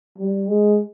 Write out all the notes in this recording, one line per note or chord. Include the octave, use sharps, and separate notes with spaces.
G3
G#3